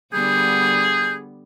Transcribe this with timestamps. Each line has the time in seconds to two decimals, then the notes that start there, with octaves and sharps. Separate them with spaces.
0.13 D3 G3 B3 G#4 G6